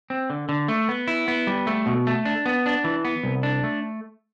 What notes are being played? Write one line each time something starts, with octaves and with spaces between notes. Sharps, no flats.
C4
D3
D3
A3
B3
E4
B3
G3
A3
B2
A3
D4
B3
D4
E3
B3
C2
D4
A3